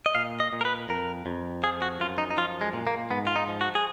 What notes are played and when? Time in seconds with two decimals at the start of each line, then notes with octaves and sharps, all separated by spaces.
0.06 D#5
0.15 A#2 F5
0.40 D#5
0.53 A#2
0.61 A#4
0.65 B4
0.89 F2 A#4
1.26 F2
1.63 F3 G#4
1.82 F#4
2.00 F#2 F4
2.18 D#4
2.31 D#4
2.37 F3 F4
2.61 G#3
2.73 A#2
2.87 A#3
3.11 G#2 B3
3.27 F4
3.36 D#4
3.48 F3
3.61 F#4
3.75 G#4